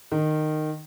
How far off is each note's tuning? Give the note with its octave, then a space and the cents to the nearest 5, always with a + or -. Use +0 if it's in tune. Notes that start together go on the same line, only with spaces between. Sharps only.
D#3 -15